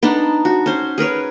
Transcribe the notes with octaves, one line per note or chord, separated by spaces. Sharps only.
B3 D4 D#4 A5
F#4
C#4 C5
G#4 A#4 B4 C#5